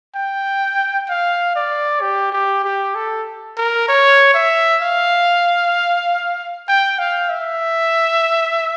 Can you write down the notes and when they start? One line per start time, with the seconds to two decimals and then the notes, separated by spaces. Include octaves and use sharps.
0.15 G5
1.09 F5
1.56 D5
2.01 G4
2.32 G4
2.64 G4
2.95 A4
3.57 A#4
3.88 C#5
4.34 E5
4.81 F5
6.68 G5
6.99 F5
7.29 E5